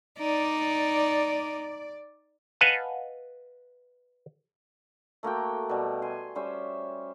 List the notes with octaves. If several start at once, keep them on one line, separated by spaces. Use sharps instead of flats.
D#4 D5
B4 D#5 F5 F#5 G#5 A5
A3 A#3 F#4 G5
B2 G3
G#5 C6
G3 C#4 C5 E5